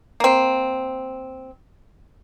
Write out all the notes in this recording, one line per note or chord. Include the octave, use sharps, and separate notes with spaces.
A#3 C4